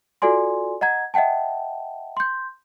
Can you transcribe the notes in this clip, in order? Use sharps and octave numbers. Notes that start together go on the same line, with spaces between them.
F4 F#4 A4 D5 G#5 C6
D#5 F#5 A#5 G#6
D#5 E5 F#5 G5 A5
C6 G6